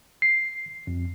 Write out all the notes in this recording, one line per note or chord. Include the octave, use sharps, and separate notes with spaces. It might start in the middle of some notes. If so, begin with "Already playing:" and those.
C7
F2